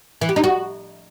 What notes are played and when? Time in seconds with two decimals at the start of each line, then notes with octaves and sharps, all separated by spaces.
0.21 E3
0.29 G4
0.36 D#4
0.44 F#4